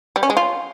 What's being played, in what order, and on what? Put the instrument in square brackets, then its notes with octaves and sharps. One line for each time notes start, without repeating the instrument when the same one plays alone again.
[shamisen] G3
C#4
G#3
F4